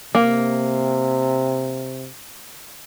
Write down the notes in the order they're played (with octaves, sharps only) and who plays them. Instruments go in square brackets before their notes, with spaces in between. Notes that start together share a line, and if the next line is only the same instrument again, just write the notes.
[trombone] C3 [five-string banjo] A#3